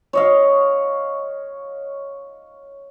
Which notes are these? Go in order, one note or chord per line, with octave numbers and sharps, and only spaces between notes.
C#5 D#5 F5